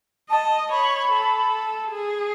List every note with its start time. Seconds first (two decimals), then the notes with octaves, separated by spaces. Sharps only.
0.30 D#5 A5
0.71 C#5 B5
1.11 A4
1.91 G#4